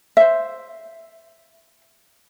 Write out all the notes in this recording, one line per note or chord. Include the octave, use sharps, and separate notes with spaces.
C5 E5